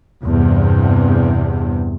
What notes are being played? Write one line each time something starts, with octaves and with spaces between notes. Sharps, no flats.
E2 G2 C3